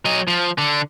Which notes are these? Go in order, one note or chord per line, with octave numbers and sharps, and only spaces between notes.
F#3 D#5
F3
D3